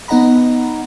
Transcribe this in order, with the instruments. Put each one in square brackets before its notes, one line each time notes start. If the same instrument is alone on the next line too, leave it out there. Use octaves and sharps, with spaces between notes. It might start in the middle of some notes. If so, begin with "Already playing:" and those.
[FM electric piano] B3 D#4 D#5 F#5 A#5 B5